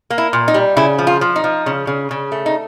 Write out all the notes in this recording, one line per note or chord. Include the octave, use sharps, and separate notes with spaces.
A#3
E4
A#2
D#4
G3
C#3 E4
F3
F4
F3
D#4
F3
C#3
C#3
C#3
A3
D#4